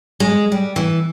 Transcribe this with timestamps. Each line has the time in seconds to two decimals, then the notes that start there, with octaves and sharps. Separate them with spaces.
0.20 G#3
0.52 G3
0.76 E3